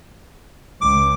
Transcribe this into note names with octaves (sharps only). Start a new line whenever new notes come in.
C#2 D6